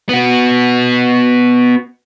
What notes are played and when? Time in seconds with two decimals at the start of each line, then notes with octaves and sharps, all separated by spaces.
0.09 B3 F#4